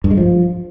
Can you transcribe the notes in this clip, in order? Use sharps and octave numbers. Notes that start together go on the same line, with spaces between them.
G2
G#3
F3